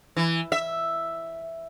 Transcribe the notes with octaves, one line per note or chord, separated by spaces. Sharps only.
E3
E5